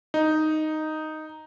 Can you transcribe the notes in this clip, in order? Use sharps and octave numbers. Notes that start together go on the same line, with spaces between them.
D#4